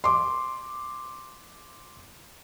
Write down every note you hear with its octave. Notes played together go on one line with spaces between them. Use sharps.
C6 D6